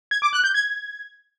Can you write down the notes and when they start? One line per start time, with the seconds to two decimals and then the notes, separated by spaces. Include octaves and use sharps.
0.11 G#6
0.22 D6
0.33 F#6
0.44 G6
0.54 G#6